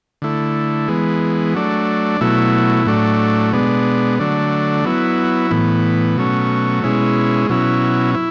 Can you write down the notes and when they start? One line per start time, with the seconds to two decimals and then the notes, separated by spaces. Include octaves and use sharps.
0.22 D3 A3 E4
0.88 E3 G#3 B3
1.55 F#3 A3 D4
2.21 B2 F#3 A3 E4
2.86 A2 F#3 A3 D4
3.53 B2 G#3 B3 D4
4.19 D3 F#3 A3 D4
4.85 F#3 B3 E4
5.51 A2 E3 B3
6.17 B2 F#3 A3 C#4
6.83 B2 G#3 C#4 E4
7.49 B2 F#3 C#4 E4
8.15 E4